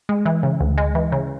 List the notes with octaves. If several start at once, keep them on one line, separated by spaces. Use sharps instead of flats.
G#3
E3
C#3
D2
G#3
E3
C#3